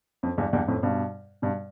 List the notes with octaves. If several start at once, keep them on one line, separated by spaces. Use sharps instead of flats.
F2
E2 G2
E2 G2
F2 A2
G2 B2
G2 B2